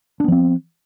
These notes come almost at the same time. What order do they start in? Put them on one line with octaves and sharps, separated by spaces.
D4 B3 F3 C4